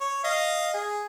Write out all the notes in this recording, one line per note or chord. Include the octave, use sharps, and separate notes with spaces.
C#5
D#5 F5
G#4